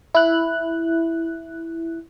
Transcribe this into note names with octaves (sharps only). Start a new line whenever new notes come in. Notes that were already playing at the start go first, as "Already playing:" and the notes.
E4 F#6